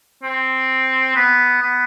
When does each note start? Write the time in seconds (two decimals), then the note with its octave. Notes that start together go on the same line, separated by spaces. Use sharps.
0.23 C4
1.16 B3
1.62 B3